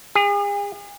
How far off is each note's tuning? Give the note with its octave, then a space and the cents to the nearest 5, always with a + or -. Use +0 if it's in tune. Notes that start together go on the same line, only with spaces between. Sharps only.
G#4 -40